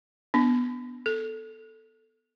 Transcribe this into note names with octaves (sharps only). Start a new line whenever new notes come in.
B3 D4
A4